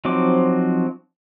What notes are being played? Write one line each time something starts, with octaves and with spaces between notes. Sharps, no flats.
F3 F#3 C4 D#4 D6